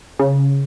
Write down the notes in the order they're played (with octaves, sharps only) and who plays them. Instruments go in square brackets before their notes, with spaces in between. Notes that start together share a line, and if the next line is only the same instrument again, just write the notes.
[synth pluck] C#3